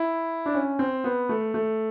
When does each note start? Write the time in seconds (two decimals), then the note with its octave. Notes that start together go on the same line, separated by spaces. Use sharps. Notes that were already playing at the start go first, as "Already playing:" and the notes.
Already playing: E4
0.46 D4
0.54 C#4
0.79 C4
1.04 B3
1.29 A3
1.54 A3